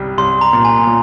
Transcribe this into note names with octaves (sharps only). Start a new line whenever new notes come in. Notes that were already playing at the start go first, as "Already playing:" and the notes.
Already playing: C2 G3
C2 C6
A#5
A#2
G#5
A#2